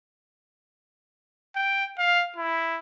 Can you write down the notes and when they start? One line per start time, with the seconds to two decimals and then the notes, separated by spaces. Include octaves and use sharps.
1.56 G5
1.99 F5
2.36 E4